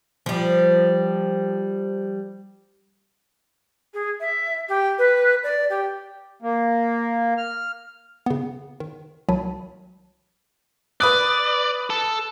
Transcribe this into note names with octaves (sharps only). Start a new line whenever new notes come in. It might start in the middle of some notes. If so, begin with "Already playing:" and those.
F3 G3
G#4
E5
G4
B4
D5
G4
A#3
F6
C#3 B3
D#3
C2 D#3 F#3 A5 B5 D#7
B4 D5 D#6 F#6
A4